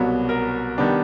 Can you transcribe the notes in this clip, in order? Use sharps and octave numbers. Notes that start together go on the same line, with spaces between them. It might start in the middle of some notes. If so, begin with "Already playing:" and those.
Already playing: C2 B2 F#3 B3
A#4
D#3 G3 B3 D4